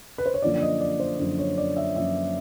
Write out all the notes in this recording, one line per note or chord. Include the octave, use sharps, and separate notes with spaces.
B4
C5
C#5
F#2 D3 F3 A#3 D5
D#5
D5
C5
F#2 D3 F3 A#3 D5
C#5
D5
E5
F#2 D3 F3 A#3 E5